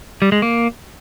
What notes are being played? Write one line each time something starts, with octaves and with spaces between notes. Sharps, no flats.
G3
G#3
A#3